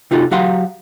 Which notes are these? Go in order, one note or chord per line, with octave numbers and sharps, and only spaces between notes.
C3 D#4 F4 F#4 A4
F#3 F#4 G4 F5 F#5 C6